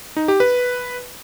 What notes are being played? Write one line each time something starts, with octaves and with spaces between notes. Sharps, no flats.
D#4
G4
B4